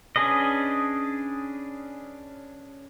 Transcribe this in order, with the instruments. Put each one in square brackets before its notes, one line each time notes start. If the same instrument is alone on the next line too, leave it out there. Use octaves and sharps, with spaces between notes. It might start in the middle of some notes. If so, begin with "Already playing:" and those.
[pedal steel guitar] C#4 D4 G#4 B4 D#5